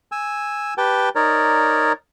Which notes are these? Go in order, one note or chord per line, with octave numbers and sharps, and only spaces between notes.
G#5 E6
G4 B4 G5 A5
D#4 A#4 C#5 D5